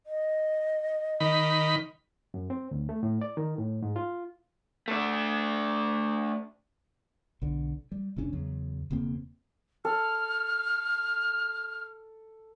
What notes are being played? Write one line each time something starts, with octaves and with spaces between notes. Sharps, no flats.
D#5
D#3 B5
F#2
C4
D2
A3
A2
D5
D#3
A2
G#2
F4
A3 D4
B1 D3
G3
F1 C3 C#4 D4
E2 C#3 F#3
E1 C#3 A#3 C4
A4 F6